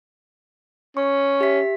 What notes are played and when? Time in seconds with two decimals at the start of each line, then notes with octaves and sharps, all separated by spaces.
0.97 C#4 C#6
1.41 G4 E5 B6